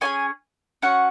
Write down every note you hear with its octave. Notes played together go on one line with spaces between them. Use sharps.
C#4 F4 G#4 G#5
C#4 F#4 F#5